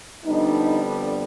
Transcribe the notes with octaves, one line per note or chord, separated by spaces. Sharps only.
F2 D3 G3 B3 D4 D#4
D4